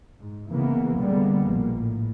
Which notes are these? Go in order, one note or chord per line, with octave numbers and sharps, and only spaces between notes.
G#2
C#3 E3 A#3 B3
D3 G3 G#3 A#3 B3
A#1 B2 A#3
A2